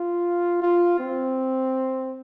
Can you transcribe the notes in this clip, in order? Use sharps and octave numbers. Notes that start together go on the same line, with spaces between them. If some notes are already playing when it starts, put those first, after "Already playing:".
Already playing: F4
F4
C4